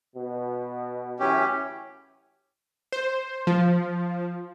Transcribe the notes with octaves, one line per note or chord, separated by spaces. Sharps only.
B2
F#2 A2 E3 C#4 G4
C5
F3